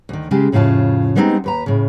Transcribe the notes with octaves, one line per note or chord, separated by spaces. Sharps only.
D2 D#3
C#3 G#3 G4
F2 A2 C#3 F4 A5
G3 G#3 B3 C4 D4 D#4
D#2 B4 A#5
A2 C#3